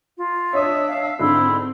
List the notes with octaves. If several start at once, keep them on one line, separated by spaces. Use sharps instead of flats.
F4
D4 C#5 D#5 E5 D#6
F5
G#2 D3 C4 E4